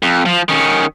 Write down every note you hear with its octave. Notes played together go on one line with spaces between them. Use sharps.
F2
F3
D#3 C#4